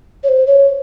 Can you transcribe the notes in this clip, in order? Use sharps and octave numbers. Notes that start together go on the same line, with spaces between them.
C#5
C5
C#5